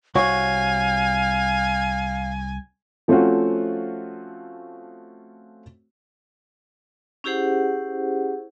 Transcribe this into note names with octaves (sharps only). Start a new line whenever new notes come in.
C2 F#4 C#5 F5 G#5
F3 A3 C4 C#4 F4 F#4
C#4 E4 G4 G#4 C5 F#5